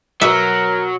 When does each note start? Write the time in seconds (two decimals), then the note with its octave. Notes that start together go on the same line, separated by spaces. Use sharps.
0.21 B2 F#3 A#4 E5